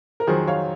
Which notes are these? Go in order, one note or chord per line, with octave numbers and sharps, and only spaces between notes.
A#4
F2 D#3 F#3 G#4 C5
C#5 F5